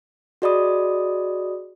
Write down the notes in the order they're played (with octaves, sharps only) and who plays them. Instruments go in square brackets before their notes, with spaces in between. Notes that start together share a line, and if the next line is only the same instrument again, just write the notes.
[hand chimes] F#4 G#4 D5 D#5 B5 D#6